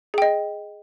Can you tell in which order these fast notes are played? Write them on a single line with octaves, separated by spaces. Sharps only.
G#4 G5 D#5